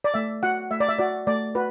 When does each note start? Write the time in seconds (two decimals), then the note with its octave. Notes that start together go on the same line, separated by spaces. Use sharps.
0.04 D5
0.14 A3 E5
0.43 F#4 F#5
0.71 A3 E5
0.80 D5
0.89 E5
0.99 F#4 D5
1.27 A3 D5
1.55 F#4 B4